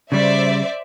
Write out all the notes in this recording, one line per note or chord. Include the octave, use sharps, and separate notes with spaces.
C#3 G3 C5 D5 E5